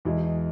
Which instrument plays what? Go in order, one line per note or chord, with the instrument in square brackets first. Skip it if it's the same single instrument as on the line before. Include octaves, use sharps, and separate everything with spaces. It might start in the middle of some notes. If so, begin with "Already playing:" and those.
[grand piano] E2 B2 G#3 E4